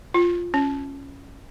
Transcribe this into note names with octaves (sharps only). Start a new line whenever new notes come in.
F4
C#4